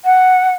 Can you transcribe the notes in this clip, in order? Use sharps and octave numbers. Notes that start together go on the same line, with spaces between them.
F#5